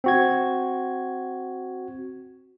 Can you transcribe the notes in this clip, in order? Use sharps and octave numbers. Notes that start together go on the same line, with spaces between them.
C4 F#4 G#6